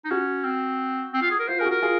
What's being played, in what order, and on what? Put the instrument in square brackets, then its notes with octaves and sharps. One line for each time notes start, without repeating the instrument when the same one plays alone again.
[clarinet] D#4
[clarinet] C#4 [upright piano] F#4
[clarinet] C4
C4
F4
G#4
A#4
[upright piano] F4 [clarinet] C5
[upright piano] G#4 [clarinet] A#4
[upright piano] F#4
[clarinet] A#4
[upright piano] F4 G#4